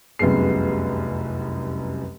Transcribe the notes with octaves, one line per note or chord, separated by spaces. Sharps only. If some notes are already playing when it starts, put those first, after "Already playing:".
F1 C2 F#2 B3 G#4 C7